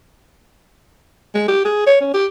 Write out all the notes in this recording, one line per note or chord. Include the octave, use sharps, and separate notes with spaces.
G#3
G4
G#4
C#5
C#4
G4